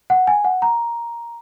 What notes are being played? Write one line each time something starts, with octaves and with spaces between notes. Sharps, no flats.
F#5
G#5
F#5
A#5